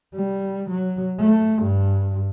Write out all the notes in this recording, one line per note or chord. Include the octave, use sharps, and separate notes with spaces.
G3
F#3
A3
G2